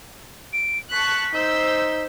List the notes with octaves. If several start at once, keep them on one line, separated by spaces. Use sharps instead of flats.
D7
A5 C#6 F#6 B6
D#4 C5 E6 G6